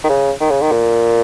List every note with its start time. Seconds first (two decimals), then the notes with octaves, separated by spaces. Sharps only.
0.04 D#3
0.09 C#3
0.40 D#3
0.50 C#3
0.62 D#3
0.72 A#2